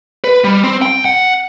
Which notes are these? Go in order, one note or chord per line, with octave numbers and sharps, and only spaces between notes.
B4
G3
C4
G5
F#5